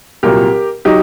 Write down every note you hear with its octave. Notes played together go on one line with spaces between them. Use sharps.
C2 A#2 F#3 G4 A#4
F#3 D#4 G4